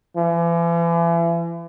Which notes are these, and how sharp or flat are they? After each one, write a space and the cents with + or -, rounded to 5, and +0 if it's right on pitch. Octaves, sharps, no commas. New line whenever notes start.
E3 +40